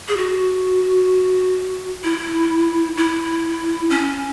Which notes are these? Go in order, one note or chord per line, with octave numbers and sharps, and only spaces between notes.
G#4
F#4
E4
E4
C#4